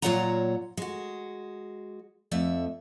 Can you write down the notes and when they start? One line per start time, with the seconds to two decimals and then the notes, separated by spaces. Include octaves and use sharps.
0.02 A#2 F#3 F4 C#5 F#5 A#5
0.77 G#3 F#4
2.32 F2 A3 E5